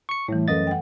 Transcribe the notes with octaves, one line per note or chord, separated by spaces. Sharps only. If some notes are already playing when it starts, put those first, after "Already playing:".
C#6 C#7
A2 E3 G3 A3
F#2 A4 B4 D#5 F5 A6
F#5 G5